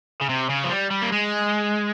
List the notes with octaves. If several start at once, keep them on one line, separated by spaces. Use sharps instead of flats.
C#3
C3
C#3
F3
G3
G3
A#3
G#3